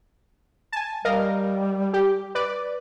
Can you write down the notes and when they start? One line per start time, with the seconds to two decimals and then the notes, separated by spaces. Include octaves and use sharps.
0.72 G#5 A5
1.05 G3 A#4 D#5 F5
1.93 G4
2.35 B4 D5